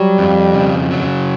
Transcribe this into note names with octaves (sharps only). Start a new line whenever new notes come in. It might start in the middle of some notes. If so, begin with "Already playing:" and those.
Already playing: F#3 G3
F2
C#3
F#3